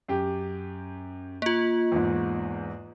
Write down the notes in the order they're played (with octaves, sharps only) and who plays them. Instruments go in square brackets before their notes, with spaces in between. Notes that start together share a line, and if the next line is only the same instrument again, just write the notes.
[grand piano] F#2 G4
[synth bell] A#3 F4
[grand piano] E2 G#2